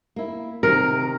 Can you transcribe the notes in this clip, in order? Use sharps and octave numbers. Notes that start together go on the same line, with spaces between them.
A#3 E4
C3 D#3 A#4 G#5